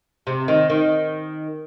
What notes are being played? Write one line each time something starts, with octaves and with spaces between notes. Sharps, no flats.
C3
D#3
D#3